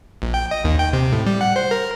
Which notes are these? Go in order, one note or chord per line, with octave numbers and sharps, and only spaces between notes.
A#1
G5
D#5
D#2
G5
C3
A2
G3
F#5
C5
A#4